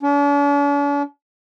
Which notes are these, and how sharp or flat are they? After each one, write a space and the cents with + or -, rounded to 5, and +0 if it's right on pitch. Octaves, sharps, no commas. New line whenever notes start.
D4 -45